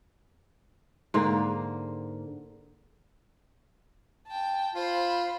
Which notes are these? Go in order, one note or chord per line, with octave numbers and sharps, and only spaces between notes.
G#2 D3 A#3
G5 A5
F4 C5 B5